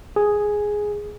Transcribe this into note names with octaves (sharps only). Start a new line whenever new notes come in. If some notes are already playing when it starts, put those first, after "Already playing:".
G#4